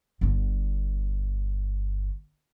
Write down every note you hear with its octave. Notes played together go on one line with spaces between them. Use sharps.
G1 D3